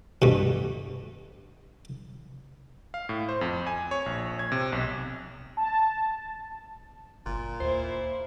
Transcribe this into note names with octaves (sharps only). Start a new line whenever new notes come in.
G2 B2
F5
A2
C5
F2
G#5
C#5
A#1
G#6
C3
B1
A5
G1 A#2
D#2 E4 C5